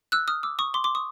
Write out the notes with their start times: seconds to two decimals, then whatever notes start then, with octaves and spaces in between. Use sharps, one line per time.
0.12 E6 F#6
0.28 D#6 F6
0.43 D6 E6
0.59 C#6 D#6
0.74 C6 D6
0.84 C6 D6
0.95 C#6 D#6